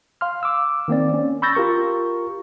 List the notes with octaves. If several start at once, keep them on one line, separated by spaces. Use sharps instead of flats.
F5 C6 F6
D6 E6
D#3 A#3 C4 D5
C#4
B5 C#6 E6 G6 A6 A#6
F4 G4 A#4 C#6